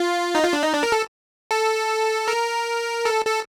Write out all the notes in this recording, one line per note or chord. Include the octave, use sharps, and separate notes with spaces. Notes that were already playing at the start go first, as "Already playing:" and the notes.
Already playing: F4
D#4
F4
D4
D#4
D4
A#4
A4
A4
A#4
A4
A4